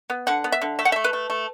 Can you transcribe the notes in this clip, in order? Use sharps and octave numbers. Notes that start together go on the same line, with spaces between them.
B3
D3 F#5
B3
E5
D3
A3 E5
F#5
A3 E5
B4
A3
A3